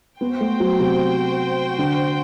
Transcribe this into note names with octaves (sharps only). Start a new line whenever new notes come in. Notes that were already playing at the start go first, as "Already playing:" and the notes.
B3 F#4 C5 G5
A3
F#3
C3
D3